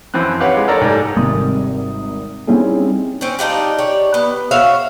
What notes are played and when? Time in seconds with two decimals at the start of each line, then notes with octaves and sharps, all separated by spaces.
0.14 F#2 E3 F3 C4 F#6
0.40 G4 B4 C#5 F5 F#5
0.53 G#3 F4
0.68 A4 A#4 C#5 D5 A#5
0.81 G#2 A3 G4
1.16 G#1 C3 G3 A#4 D#6
2.47 G3 C4 C#4 D#4 E4 G#4
3.21 C4 C#4
3.39 D4 D#4 F4 G4
3.78 G4 C#5 D5
4.14 B3
4.51 F#4 C#5 E5 F5